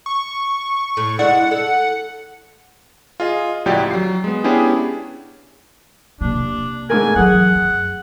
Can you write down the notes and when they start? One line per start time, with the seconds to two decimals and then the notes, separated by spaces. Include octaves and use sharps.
0.06 C#6
0.97 A2
1.19 G#3 D4 E4 F#5
1.51 A4
3.20 F4 G#4 D#5
3.66 C#2 A2 F3 F#4 G4 D5
3.91 F#3 C7
4.24 G#3 B3
4.44 B3 C#4 D4 E4 G4 G#4
6.21 C3 A#3 D4
6.90 G#2 A3 A#4 G#5
7.15 E3 F#3 G#4 F#5
7.55 F#2